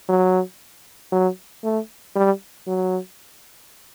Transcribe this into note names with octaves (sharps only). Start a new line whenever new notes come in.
F#3
F#3
A3
G3
F#3